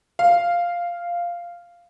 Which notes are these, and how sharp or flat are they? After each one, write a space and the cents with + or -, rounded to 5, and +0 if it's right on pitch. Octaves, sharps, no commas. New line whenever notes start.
F5 -5